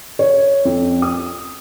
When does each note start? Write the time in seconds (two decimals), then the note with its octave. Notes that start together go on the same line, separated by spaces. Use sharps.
0.19 C#5
0.65 F2
1.02 D#6